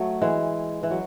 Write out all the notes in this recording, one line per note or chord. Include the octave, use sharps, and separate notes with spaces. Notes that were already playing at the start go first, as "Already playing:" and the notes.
Already playing: F#3 A3
E3 G#3
E3
F#3